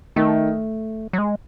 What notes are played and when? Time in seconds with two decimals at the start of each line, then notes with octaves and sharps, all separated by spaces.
0.16 D#3 A3
1.13 F#3
1.18 G#3